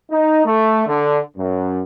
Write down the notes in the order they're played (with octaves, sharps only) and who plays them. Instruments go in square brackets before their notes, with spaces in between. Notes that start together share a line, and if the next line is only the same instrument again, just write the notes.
[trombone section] D#4
A3
D3
F#2